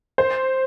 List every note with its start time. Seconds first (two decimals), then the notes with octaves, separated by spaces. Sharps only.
0.18 C5